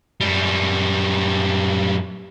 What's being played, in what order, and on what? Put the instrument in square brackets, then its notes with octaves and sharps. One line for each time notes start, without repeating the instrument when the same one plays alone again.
[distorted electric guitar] F#2 G3